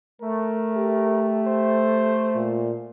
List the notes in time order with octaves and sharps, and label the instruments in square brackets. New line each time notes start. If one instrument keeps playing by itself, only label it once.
[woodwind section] A3 [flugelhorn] A#4
[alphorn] G4
[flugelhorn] C5
[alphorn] A#2